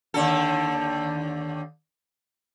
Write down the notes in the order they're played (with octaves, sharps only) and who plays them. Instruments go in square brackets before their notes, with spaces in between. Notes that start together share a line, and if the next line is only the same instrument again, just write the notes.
[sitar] D#2 D3 A4